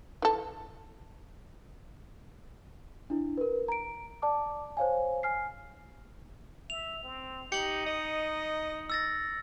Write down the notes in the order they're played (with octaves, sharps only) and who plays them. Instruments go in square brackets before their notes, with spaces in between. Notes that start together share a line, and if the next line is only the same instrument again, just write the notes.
[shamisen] E3 A4
[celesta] D4 E4
A#4 B4
A#5 D7
D5 A5 D6
C5 C#5 F5 G#5
G#5 F6 C7
[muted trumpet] E5 [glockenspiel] F7
[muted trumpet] C4
[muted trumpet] D#4 [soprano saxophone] G4 [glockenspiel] C#7 F#7
[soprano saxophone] D#5
[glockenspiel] E6 A6 A#6